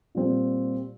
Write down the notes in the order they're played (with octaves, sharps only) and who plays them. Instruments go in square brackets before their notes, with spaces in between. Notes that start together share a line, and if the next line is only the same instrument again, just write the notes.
[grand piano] A#2 G3 C4